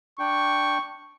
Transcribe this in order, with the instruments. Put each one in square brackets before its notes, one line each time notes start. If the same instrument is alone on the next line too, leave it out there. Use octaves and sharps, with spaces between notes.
[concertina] D4 G5 [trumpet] C#6